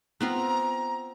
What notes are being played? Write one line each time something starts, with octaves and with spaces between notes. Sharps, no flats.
B3 C4 F4 A#5